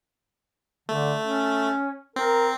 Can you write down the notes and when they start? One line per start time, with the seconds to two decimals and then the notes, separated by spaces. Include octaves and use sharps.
0.89 D3 A3
1.22 C#4
2.16 C4 A#4